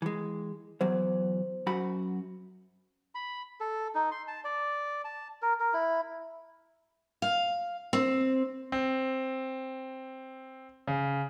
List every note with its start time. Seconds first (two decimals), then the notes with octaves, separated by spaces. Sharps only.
0.02 E3 G#3
0.81 E2 F#3 C5
1.67 F#2 F#4 B5
3.15 B5
3.60 A4
3.95 D#4
4.12 C6
4.28 A5
4.44 D5
5.05 A5
5.42 A#4
5.60 A#4
5.74 E4
7.22 F5
7.93 C4
8.72 C4
10.87 C#3